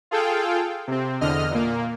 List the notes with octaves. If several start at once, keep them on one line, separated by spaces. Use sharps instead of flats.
F4 G#4 A4 F5 G5
C3 C4
E2 D3 D#5 F6
A#2 A#3